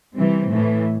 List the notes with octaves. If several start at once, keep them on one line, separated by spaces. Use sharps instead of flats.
C3 E3 G3 C4
A2 E3 A3